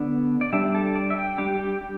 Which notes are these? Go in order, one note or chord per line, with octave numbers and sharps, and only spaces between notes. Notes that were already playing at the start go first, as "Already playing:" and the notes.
Already playing: D3 B3 D4
D5
G3 D4 E5
A4
D5
E5
G5
G3 D4 G4
G4
G4